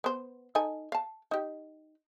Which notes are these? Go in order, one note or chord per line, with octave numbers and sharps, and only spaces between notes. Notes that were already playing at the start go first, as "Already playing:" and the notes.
B3 C5
D#4 A4 G#5
F5 A5
D#4 G4